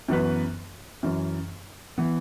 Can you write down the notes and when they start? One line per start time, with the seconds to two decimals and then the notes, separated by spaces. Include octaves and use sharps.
0.08 F#2 E3 B3 F#4 B4
1.03 F#2 E3 C#4
1.98 E3 B3